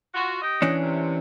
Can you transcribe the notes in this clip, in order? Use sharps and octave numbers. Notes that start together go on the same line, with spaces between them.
F4 F#4
G4 D#5
E3 C#4 D4
C3